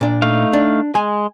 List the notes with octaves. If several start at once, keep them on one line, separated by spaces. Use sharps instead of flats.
A#2 D4
A3 D#4 F5
D4
G#3 G#5